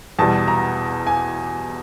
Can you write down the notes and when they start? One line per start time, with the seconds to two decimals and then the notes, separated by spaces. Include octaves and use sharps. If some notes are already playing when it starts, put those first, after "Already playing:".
0.19 E2 B2 G3 A5
0.48 A#5
1.07 G#5